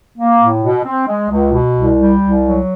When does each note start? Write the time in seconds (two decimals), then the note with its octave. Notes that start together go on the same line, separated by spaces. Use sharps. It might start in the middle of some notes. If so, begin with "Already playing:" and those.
0.16 A#3
0.39 A2
0.62 B2
0.85 C4
1.08 G#3
1.30 C#2
1.53 B2
1.76 C2
1.98 G3
2.21 C2
2.44 F#3